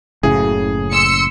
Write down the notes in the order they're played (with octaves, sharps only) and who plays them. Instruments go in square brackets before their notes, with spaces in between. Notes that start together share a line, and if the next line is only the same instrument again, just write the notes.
[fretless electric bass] F#1 A2 C#3 [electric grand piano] G#4
[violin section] C6 E6 C#7